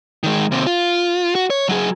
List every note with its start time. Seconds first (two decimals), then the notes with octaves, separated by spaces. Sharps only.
0.24 D#3 G#3
0.52 D#2 C3
0.67 F4
1.35 F#4
1.50 C#5
1.69 F#3 G#4